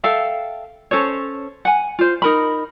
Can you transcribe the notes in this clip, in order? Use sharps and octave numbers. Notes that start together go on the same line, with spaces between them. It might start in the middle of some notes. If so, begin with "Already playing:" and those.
A4 E5 F5 G5
C#4 A4 C5 C#5
F#5 G#5
F4 C5
D#4 A#4 B5